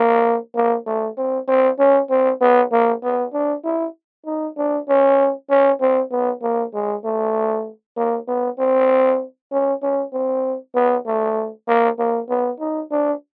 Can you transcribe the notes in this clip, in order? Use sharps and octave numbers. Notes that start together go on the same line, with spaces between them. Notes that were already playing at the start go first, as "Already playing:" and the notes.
Already playing: A#3
A#3
A3
C4
C4
C#4
C4
B3
A#3
B3
D4
E4
D#4
D4
C#4
C#4
C4
B3
A#3
G#3
A3
A#3
B3
C4
C#4
C#4
C4
B3
A3
A#3
A#3
B3
D#4
D4